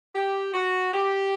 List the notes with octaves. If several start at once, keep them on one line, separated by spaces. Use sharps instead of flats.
G4
F#4
G4